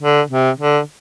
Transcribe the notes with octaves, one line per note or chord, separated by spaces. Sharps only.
D3
C3
D3